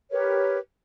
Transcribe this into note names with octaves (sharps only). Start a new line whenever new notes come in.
G4 A#4 B4 C#5